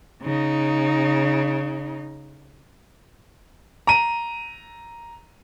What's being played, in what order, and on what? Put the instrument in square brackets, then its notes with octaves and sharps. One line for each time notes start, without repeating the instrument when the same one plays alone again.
[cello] C#3 D#4
[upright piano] A#5 D#7